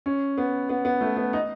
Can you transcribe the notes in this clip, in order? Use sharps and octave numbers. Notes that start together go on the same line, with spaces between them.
C#4
B3
B3
B3
A3
B3
D#4